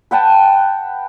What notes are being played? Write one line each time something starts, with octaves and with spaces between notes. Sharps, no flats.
B4 F#5 G5 A5